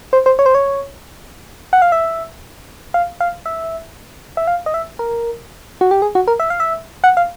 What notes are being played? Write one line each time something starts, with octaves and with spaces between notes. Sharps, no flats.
C5
C5
C#5
C5
C#5
F#5
F5
E5
F5
F5
E5
E5
F5
D#5
E5
A#4
F#4
G4
G#4
F#4
A#4
E5
F5
E5
F#5
F5